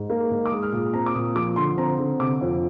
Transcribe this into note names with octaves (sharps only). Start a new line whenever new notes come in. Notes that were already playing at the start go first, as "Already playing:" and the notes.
Already playing: G#2
A#3
G#2
D6
G#3 D#6
F6
A#2 D#6
C4 A#5
D6
A#2 D#6
F3 D6
D3 C6
C4 A#5
D3
C3 D6
F2